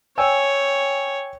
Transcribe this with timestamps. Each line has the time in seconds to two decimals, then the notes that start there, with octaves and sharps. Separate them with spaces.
0.18 C#5 G5 G#5 E6